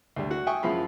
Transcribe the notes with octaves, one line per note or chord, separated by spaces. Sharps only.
D2 G3
F#4
E5 G5 G#5 C#6 D#6
F#2 F3 G#3 E4 F4 B5